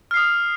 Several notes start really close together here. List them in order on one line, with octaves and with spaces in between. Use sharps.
F6 C7 D#6